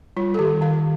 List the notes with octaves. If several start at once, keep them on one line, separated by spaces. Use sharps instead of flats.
G3 F4
A4
D#3 G4
D#3 F5